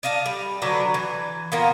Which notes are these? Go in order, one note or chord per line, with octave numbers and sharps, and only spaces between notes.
D5 D#5 F5 A5
G3
D3 F#3 D4 B4
E3
A#2 A#3 B3